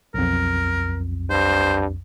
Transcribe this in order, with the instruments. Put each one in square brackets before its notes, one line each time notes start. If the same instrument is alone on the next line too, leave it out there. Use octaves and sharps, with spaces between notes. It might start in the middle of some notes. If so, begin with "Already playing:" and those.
[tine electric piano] B1 F2 [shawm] A#4
[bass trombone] G2 [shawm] C5